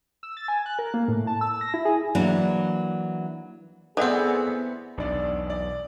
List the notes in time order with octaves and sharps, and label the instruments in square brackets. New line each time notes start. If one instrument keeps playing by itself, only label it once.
[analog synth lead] E6
A6
G#5
F#6
A#4
A#3
A2
A5
E6
A#6
E4
G#4
[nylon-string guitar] E3 F#3 A#3 D4
[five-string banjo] E3 C4 [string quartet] B3 [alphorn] G#4 [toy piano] A4 D5 F#5
[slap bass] B1 E2 [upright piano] D4 D5
[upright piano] D5